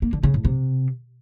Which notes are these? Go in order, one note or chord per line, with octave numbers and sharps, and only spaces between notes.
A#3
D3
C#3
A2
C3